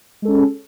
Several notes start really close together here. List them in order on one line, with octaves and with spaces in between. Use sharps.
G#3 A4 C#4